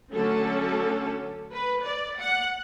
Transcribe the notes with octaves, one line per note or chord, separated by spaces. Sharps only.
D3 F#3 A3 C#4 A4
B4
D5
F#5